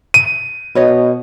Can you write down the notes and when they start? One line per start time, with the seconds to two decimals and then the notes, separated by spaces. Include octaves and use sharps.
0.14 D#7
0.75 B2 B4 C#5 D#5